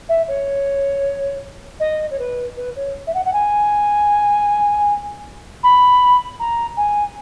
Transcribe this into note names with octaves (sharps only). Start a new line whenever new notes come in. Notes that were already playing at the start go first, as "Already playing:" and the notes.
E5
C#5
D#5
C#5
B4
B4
C#5
E5
F#5
F#5
G#5
B5
A#5
G#5